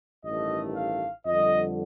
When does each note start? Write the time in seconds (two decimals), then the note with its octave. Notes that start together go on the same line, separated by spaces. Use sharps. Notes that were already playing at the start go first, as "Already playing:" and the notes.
0.25 A1 G2 D#3 A3 D#5
0.76 F5
1.26 F2 D3 G3 D#5